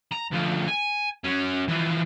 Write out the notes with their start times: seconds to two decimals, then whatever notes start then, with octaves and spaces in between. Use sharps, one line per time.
0.12 A#5
0.32 D2 F3
0.68 G#5
1.24 F#3 C#4
1.68 E3 F3